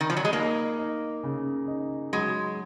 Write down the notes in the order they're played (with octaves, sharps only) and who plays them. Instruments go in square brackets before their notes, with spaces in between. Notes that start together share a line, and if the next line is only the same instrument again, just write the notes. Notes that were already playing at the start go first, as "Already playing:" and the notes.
[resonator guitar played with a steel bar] D#3
F3
F#3
G#3
[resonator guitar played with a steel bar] A#3 [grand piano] D#4
[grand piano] D#4
C#3
D#4
[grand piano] F#3 [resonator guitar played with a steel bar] G#3